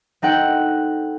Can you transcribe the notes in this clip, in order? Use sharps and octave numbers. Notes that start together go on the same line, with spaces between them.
C4 D#4 A4 F#5 G5